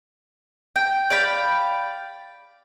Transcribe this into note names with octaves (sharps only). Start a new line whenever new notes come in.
G5
D5 F5 G5 B5